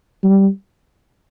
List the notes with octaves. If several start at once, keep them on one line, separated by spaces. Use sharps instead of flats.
G3